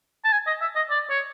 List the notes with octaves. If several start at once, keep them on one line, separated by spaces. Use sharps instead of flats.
A5
G#5
D#5
E5
D#5
D5
C#5